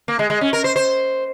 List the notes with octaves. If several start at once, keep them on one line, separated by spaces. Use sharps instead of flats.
A#3
G#3
G#3
C#4
A#4
C5
C5